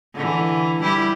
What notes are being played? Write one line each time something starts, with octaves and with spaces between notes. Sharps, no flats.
D3 E3
G3 E4 G4